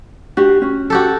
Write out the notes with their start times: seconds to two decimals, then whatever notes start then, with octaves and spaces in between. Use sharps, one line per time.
0.37 D4 F#4 G4
0.62 C#4
0.90 F#4 G4 A4